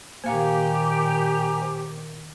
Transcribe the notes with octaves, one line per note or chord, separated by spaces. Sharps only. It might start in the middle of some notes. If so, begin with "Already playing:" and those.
A#2 D#3 A#3 G4 C5 F5 G#5 A#5